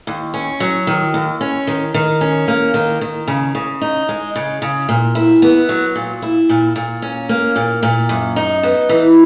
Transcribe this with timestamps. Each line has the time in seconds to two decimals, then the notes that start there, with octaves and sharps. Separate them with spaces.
0.07 D#2
0.34 C#4
0.60 F#3
0.87 D#3
1.14 D#2
1.41 C#4
1.67 D#3
1.94 D#3
2.21 C#4
2.48 A#3
2.74 D#3
3.01 D#3
3.28 C#3
3.55 C#3
3.81 D#4
4.09 G#3
4.36 C#3
4.62 C#3
4.89 A#2
5.15 E4
5.42 B3
5.69 F#3
5.95 A#2
6.22 E4
6.49 A#2
6.76 A#2
7.02 C#4
7.29 A#3
7.56 A#2
7.83 A#2
8.09 F#2
8.36 D#4
8.63 B3
8.89 E3